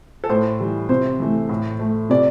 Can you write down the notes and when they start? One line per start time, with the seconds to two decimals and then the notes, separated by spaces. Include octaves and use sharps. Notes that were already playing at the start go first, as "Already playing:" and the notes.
0.24 A4
0.29 A2 C5
0.60 E3 G3
0.89 C3 C5
1.20 E3 A3
1.49 A2
1.79 A3
2.10 C3 D5